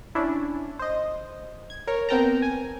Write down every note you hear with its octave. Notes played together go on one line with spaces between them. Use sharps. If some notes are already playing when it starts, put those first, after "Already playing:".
C#4 D4 E4
C5 D#5
G#6
A#4 C#5
B3 C4 A#4 G5 A5 A#5
G#5